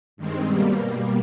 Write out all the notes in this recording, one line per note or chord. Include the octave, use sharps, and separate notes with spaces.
G2 D#3 G#3 C4
B2 G3 A#3